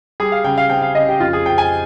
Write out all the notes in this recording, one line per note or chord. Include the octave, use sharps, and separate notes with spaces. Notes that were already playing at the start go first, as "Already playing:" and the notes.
G3 G#4
F5
C#3 G5
F5
C4 G5
F5
C#3 D#5
G4
F2 F4
G#4
F2 G5
G#5